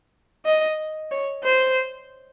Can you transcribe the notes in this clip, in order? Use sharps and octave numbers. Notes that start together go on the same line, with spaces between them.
D#5
C#5
C5